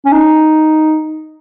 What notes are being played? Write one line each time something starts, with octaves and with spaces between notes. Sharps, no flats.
C#4
D#4